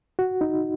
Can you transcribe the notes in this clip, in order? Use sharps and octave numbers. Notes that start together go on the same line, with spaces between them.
F#4
D#4